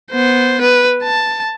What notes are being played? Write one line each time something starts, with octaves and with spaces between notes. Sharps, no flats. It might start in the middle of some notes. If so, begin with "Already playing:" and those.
B3 C5
B4
A5